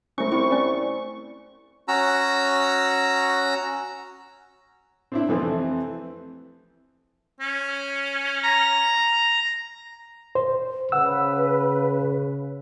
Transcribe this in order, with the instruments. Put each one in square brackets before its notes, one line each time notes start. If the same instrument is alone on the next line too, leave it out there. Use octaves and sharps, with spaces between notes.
[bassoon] C2 [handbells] A3 C#4 [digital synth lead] C#6
[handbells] C4 E4 C5
C#4 D5
[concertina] C#4 F#4 A#5 E6
[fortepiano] C4 D4 E4
F2 C3 E3 A3 C4
[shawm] C#4
[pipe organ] A#5
[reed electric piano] C5
[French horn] C#3 [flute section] B4 [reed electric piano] F#5 E6